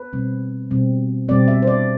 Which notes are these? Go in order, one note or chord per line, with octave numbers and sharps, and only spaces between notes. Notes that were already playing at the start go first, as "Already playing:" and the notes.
Already playing: B4
B2 G3 C4
B2 G3 C4
B2 G3 C4 D5
E5
C5
D5